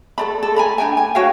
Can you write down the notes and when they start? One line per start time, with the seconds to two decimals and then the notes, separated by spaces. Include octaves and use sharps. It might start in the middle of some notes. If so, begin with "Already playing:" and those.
0.18 A4 D5 B5
0.43 A4
0.56 G#5 A#5 B5
0.78 D4 G5 G#5
0.97 G#5
1.15 F#4 C#5 F5 G5